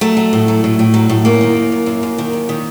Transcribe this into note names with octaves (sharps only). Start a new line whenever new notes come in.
F#3 A3
F#3
A2
F#3
A2
A2
F#3
A2
F#2 A#3
D#3
F#2
F#2
F#2
F#2
D#3
F#2
D#3